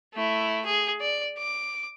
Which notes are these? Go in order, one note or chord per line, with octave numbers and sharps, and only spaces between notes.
A3 E4
G#4
D5
D6